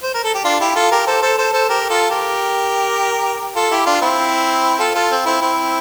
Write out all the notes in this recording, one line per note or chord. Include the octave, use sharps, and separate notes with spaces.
C5
A#4
A4
G4
D4 F4
E4 G4
F4 A4
G4 A#4
A4 C5
A4 C5
A4 C5
A4 C5
G4 A#4
F4 A4
G4 A#4
F4 A4
E4 G4
D4 F4
C4 E4
F4 A4
F4 A4
C4
C4 E4
C4 E4